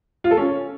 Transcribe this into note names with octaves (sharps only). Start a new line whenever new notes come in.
F4
A4
C#4